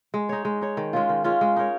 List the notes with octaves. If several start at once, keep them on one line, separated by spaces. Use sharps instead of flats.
G#3
D#4 C#5
G#3
D#4 C#5
D#3
G#3 C#4 F4
D#3
G#3 C#4 F4
G#3
D#4 A#4 C#5